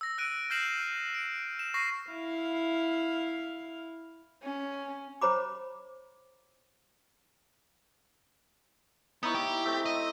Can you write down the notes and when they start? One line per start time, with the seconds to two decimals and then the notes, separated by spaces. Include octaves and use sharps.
0.01 E6 A#6
0.18 E6 F#6 D7 D#7
0.50 F6 G6 A#6 C7 E7 F#7
1.14 D7
1.59 E7
1.74 C#6 A#6 C7
2.11 E4 F5
4.43 C#4
5.21 C5 C#5 A#5 B5 D6
9.23 B3 D#4 E4 C#5
9.35 G4
9.65 A3 C4
9.85 D#5